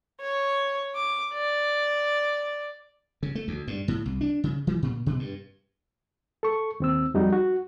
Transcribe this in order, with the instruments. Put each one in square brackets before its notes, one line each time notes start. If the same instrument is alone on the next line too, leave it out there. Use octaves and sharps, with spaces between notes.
[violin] C#5
D6
D5
[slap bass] C#3
A3
D2
G2
A2
C2
D4
C#3
E3
A#2
B2
G2
[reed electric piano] A4 C#6
D#2 C4 E6
F2 G3 D#4 F#4
F#4